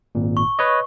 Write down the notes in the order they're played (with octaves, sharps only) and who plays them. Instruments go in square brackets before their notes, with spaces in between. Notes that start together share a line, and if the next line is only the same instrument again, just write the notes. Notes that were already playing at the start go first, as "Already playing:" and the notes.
[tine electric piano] G#1 A#2
[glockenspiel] C#6
[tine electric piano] B4 C#5 D#5